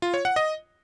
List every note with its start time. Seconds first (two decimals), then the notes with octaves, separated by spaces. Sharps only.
0.02 F4
0.14 C#5
0.25 F#5
0.36 D#5